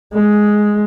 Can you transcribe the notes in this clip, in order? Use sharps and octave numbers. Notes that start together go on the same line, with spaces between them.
G#3